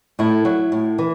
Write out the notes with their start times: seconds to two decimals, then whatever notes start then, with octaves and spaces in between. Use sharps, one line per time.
0.19 A2 E4
0.45 F#3
0.72 A2
0.98 E3